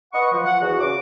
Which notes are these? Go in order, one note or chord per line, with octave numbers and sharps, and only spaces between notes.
B4 D#5 F#5 C#6
F3
F#5
E2 F#4
C#3 D6